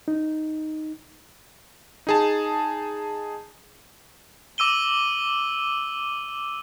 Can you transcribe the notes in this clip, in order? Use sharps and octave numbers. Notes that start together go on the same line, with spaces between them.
D#4
D#4 G#4 A5
D6 E6 D#7 G7